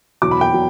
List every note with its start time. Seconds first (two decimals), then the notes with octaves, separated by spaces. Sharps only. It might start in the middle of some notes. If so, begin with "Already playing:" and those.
0.22 E2 B2 F#3 D6
0.31 B5
0.41 G5
0.53 B2 F#3